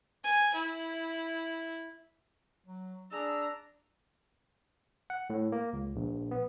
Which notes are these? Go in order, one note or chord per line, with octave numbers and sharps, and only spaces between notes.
G#5
E4
F#3
D4 G#4 A#5 E6
F#5
A2
A#3
C#2
A#1
B3